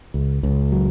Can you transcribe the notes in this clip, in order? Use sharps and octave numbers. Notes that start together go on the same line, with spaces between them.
C#2
C#2
F#3